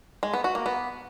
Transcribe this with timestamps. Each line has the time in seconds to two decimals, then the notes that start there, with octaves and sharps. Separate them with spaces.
0.23 G#3
0.34 B3
0.44 F#4
0.55 A#3
0.66 B3